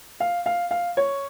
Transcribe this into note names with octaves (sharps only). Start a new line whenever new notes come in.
F5
F5
F5
C#5